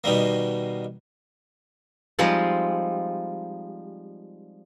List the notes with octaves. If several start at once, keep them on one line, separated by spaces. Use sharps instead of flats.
B2 D#3 G3 A#3
F3 G3 G#3 C4 D#4 F4